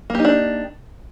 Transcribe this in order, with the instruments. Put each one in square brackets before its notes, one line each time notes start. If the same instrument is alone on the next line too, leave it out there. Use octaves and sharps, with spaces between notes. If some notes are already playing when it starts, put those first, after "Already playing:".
[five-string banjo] A#3
G4
D#4
D4